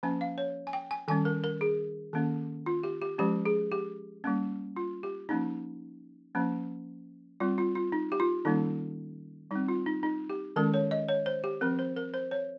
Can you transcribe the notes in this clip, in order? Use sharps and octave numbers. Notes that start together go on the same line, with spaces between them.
F3 A#3 C#4 G#5
F5
C#5
G#5
G5
G#5
D#3 G3 C#4 G#5
A#4
A#4
G#4
D#3 A#3 C#4
F4
G4
G4
F3 G#3 C#4 G4
G#4
G4
G3 A#3 C#4
F4
G4
F3 A#3 C#4 D#4
F3 A#3 C#4
G3 C4 F4
F4
F4
D#4
G4
F4
D#3 G3 A#3 C#4 D#4
G3 C4 D#4
F4
D#4
D#4
G4
D#3 G#3 C#4 A#4
C#5
D#5
C#5
C5
G4
F3 C4 A#4
C5
A#4
C5
C#5